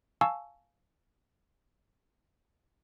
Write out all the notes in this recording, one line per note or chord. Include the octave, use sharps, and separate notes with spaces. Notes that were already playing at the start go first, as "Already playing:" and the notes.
F5 G#5 A5 C#6 E6